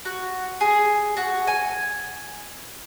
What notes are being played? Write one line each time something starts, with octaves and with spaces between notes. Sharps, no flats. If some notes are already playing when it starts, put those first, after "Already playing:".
F#4
G#4
F#4
G#5